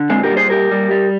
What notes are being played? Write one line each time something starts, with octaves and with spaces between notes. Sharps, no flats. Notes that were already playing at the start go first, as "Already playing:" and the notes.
Already playing: D3
A#2 G#3 C4
G4 A#4
G3
G#4 C5
A#2 G4 A#4
G3
G3